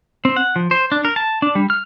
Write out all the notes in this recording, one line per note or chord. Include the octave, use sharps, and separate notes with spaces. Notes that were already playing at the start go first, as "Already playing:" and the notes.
C4
F#5
F3
C5
D4
A#4
A5
D4
G3
F6